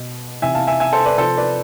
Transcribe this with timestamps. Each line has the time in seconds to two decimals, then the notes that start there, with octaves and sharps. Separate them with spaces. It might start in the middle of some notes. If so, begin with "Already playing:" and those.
Already playing: B2
0.42 C3 E3 E5 G#5
0.55 F5 A5
0.67 E5 G#5
0.80 E5 G#5
0.93 A4 C5
1.05 B4 D5
1.18 C3 F3 A4 C5
1.37 B4 D5